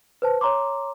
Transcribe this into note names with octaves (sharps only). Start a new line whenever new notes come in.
B4 C5 A5
C#5 A#5 C6 D6